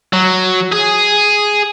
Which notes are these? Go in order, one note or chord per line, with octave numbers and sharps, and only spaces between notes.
F#3
G#4